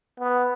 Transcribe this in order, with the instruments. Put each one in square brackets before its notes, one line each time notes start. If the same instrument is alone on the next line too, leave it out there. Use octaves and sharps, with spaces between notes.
[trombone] B3